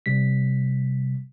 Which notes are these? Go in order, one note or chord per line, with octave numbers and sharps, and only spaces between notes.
C3 G3 B6